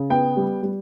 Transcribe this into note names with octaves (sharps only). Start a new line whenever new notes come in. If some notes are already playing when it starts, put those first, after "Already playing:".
Already playing: C#3
B3 G5
G3
G3